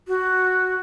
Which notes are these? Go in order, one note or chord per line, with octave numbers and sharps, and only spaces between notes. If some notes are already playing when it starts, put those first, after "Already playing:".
F#4